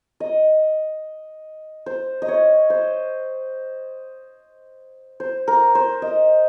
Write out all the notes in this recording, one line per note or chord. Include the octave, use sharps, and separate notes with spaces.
D#5
C5
D#5
C#5
C5
C5
A#4
C5
D#5